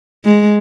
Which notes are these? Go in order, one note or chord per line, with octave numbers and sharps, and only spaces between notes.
G#3